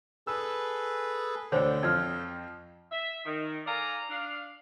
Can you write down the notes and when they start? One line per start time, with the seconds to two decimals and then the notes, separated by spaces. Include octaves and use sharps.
0.27 G#4 A4 B4 E6
1.52 D2 D3 A4 C5 C#5 G5
1.83 F2 F3 F6 G#6
2.91 E5
3.26 D#3
3.66 A4 D5 F5 G#5 A#5
4.10 D4 F5